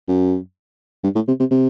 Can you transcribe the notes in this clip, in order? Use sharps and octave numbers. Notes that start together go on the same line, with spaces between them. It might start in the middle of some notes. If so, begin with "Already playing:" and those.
F#2
G2
A2
C3
C3
C3